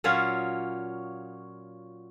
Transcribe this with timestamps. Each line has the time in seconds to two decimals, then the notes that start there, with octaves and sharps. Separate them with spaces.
0.04 A#2 F#3 C#4 F4